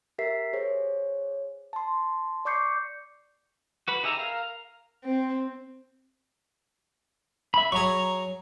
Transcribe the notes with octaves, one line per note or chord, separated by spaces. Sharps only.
G4 A#4 E5 B6 C7
G#4 C5 C#5
A5 C6
D5 C#6 D6 G6 C7 C#7
F#4 B4 B5
D#4 G4 G#4 E5 A#5
A#4 F5 A#5
C4
E5 B5
F#3 G#4 A#5 C#6